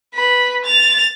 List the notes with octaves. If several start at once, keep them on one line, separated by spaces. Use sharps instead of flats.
B4 B5
A6 F7